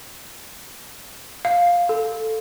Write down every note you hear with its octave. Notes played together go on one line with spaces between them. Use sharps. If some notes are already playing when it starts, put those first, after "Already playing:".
F5
A4